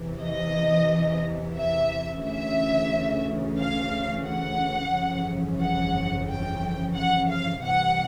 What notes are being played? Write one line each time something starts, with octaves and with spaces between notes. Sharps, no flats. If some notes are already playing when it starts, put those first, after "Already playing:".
Already playing: E2 C3 E3
D#5
E5
D2 C#3 E3 E5
F5
F#5
G1 F2 C#3 E3
F#5
G5
F#5
F5
C2 C3 E3 F#5